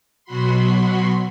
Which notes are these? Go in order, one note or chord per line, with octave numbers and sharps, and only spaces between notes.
B2 F#3 F#4 B5 C6